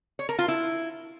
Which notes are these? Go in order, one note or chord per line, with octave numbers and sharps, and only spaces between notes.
C#5
A#4
F4
E4